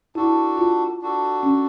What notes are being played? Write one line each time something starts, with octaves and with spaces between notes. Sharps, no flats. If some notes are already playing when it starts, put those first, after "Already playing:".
D4 E4 F#4 A4
F4
D4 F#4 A4
C#4